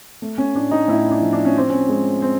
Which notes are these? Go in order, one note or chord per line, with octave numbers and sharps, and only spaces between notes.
A3
C#4
A2 D4
D#4
A2 E4
D4
F3
D4
C#4
F3 C4
C#4
G#3
C4